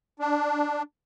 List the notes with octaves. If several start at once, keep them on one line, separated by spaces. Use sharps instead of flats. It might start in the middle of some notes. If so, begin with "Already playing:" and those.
D4